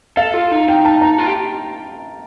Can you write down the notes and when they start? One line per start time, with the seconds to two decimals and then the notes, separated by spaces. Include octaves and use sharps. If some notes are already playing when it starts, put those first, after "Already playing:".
0.17 A4 F5
0.34 F4
0.51 D#4
0.69 D#4 G5
0.85 A5
1.02 A#5
1.18 F4
1.26 G4